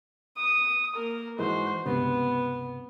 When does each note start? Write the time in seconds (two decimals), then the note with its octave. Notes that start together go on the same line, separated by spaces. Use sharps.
0.36 D#6
0.96 A#3 A#4
1.39 G#2 E3 G#3 F#4 C5
1.86 C#2 G2 C3 B3